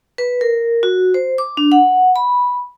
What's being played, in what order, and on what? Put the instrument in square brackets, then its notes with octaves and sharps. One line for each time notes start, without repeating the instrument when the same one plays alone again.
[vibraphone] B4
A#4
F#4
C5
D6
D4
F#5
B5